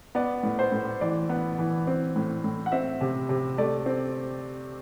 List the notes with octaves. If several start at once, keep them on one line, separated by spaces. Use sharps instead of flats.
B3 D5
A2
C5
A2
E3 D5
B3
E3
C4
A2
A2
F#5
C4 E5
C3
C3
A3 D5
C4